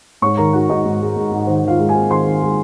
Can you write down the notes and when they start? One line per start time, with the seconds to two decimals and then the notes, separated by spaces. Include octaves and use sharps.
0.22 G#2 C#5 C#6
0.37 D#3 A#4 A#5
0.53 D#3 F#4 F#5
0.69 G#2 D#4 D#5
0.85 G#2
1.01 G#3
1.17 G#2
1.31 G#2
1.47 D#3 C5
1.64 D#3 F4 F5
1.79 G#3
1.89 G#4 G#5
1.95 C4
2.10 D#3 C5 C6
2.26 D#3
2.42 G#3